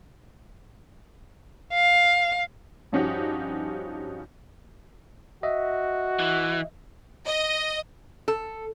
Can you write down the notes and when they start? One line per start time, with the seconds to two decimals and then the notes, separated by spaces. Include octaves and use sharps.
1.73 F5
2.92 G2 F3 C#4 D#4 F#4 G4
5.43 F#4 D#5 E5
6.19 E3
7.26 D#5
8.28 A4